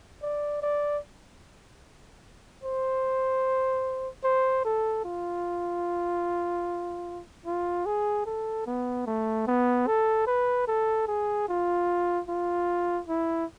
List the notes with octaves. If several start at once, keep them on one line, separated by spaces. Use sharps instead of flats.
D5
D5
C5
C5
A4
F4
F4
G#4
A4
B3
A3
B3
A4
B4
A4
G#4
F4
F4
E4